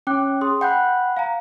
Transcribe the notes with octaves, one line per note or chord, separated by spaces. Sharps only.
C#4 G5 D6 F#6
G#4 C6 D#6
F#5 G5 B5 F#6 G6
F5 G#5 A#5